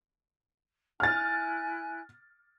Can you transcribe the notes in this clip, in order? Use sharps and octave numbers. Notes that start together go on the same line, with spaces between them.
E4 G#5 F6 F#6 A6